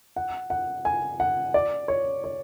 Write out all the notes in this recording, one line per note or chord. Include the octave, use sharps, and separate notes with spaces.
F#5
F#5
G#5
F#5
D5
C#5
C#5